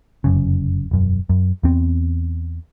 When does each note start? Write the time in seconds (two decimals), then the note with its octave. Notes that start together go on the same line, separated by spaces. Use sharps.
0.24 F1 F#2 C#3
0.91 E1 F#2
1.29 F#2
1.63 E2 B3 C4